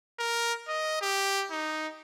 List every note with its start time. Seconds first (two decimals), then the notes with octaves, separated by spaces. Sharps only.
0.19 A#4
0.68 D#5
1.01 G4
1.51 D#4